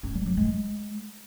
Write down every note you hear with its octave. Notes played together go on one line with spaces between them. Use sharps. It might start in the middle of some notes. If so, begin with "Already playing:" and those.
C#4
G3
F#3
G#3